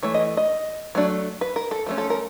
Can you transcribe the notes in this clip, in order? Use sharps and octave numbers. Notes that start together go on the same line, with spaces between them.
E3 A3 C#5
D#5
D#5
F#3 A3 D4
B4
A#4
A4
F3 A3 C#4
A4
A#4